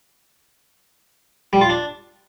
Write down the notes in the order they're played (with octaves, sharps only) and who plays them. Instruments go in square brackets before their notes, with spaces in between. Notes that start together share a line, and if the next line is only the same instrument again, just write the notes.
[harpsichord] G3
F4
D4